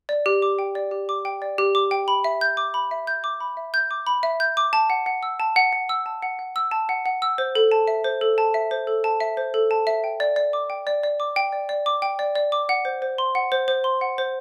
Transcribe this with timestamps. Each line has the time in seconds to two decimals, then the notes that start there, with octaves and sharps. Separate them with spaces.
0.09 D5
0.26 G4
0.42 D6
0.59 G5
0.75 D5
0.91 G4
1.09 D6
1.25 G5
1.42 D5
1.58 G4
1.75 D6
1.91 G5
2.08 B5
2.24 E5
2.41 G6
2.57 D6
2.74 B5
2.91 E5
3.07 G6
3.24 D6
3.40 B5
3.57 E5
3.74 G6
3.91 D6
4.07 B5
4.23 E5
4.40 G6
4.57 D6
4.73 A5
4.90 F#5
5.06 F#5
5.23 E6
5.40 A5
5.56 F#5
5.73 F#5
5.89 E6
6.06 A5
6.22 F#5
6.39 F#5
6.56 E6
6.71 A5
6.89 F#5
7.06 F#5
7.22 E6
7.38 C5
7.55 A4
7.71 A5
7.88 E5
8.04 C5
8.21 A4
8.38 A5
8.54 E5
8.71 C5
8.87 A4
9.04 A5
9.20 E5
9.37 C5
9.54 A4
9.71 A5
9.87 E5
10.04 G5
10.20 D5
10.36 D5
10.53 D6
10.70 G5
10.87 D5
11.03 D5
11.20 D6
11.36 G5
11.52 D5
11.69 D5
11.86 D6
12.02 G5
12.19 D5
12.35 D5
12.52 D6
12.69 F#5
12.85 C5
13.02 C5
13.18 C6
13.35 F#5
13.52 C5
13.68 C5
13.84 C6
14.01 F#5
14.18 C5